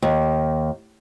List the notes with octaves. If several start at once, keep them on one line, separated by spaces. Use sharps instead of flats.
D#2